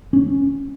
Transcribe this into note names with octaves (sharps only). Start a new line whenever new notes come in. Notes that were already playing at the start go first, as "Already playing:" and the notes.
C#4